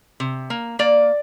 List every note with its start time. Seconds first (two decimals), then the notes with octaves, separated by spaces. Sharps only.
0.20 C3
0.50 A#3
0.79 A#3 D5